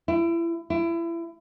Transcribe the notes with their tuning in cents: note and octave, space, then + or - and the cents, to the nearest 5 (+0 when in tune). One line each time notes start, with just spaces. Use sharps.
E4 +30
E4 +30